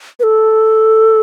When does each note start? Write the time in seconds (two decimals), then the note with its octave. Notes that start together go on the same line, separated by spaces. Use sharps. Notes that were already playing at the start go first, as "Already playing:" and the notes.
0.20 B4
0.23 A4